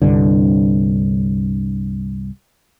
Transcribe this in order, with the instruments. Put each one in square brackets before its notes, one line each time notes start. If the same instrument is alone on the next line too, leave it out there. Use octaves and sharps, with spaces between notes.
[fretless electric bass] C2 G2 D3